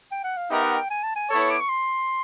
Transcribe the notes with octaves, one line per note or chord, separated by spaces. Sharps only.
G5
F#5
F5
B3 D#4 G4 A#4 D#5 E5
F#5
G5
G#5
A5
G#5
B3 E4 A4 C#5 A5
C#6
D6
C#6
C6